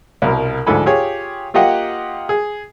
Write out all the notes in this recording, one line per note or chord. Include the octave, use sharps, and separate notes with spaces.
C2 B2 A#4
D2 G#2 F3 A4 G#5 B5
F4 G4 G#4 C#5
A#3 F4 G4 D#5 F#5 G5
G#4